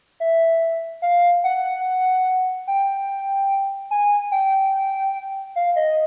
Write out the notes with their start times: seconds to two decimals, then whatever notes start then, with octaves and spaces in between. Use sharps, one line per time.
0.20 E5
1.02 F5
1.44 F#5
2.67 G5
3.91 G#5
4.32 G5
5.56 F5
5.76 D#5